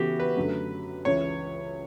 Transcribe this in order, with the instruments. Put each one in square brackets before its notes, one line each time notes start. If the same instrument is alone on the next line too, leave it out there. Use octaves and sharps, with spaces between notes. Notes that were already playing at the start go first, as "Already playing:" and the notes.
Already playing: [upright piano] C#3 E3 B3 E4 A4 [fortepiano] F#4 G4
[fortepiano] B4
[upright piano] F#2 D3 F#3 A3
[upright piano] C#2 C#3 E3 [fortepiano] C#5